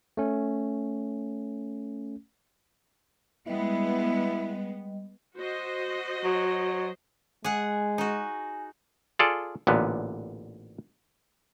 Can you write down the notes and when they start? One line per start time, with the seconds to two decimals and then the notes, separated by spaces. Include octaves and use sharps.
0.17 A3 C#4
3.47 G3 G#3 B3 E4 D#5
5.37 F#4 C5 D#5
6.24 F#3
7.44 G#3 G#4 F#5 G#5
7.98 D#4 F#4
9.19 F4 G#4 A4 D5
9.67 A1 A#2 D3 B3